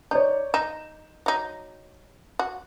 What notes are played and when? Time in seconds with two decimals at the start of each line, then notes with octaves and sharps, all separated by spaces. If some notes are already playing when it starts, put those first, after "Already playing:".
0.11 D#4 C#5 D5 G6
0.54 D#4 E7
1.26 F#3 D#4
2.39 F#4